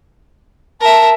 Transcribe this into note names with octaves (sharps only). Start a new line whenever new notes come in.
A#4 E5 A5